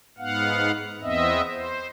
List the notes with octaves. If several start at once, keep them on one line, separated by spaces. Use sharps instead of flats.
G#2 B3 F5 F#5
E2 B3 C4 D#5 E5
C5